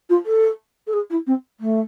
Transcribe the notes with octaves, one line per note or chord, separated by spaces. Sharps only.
F4
A4
A4
G#4
E4
C4
A3